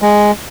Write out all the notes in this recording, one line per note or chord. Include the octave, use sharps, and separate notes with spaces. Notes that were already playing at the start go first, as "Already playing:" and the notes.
G#3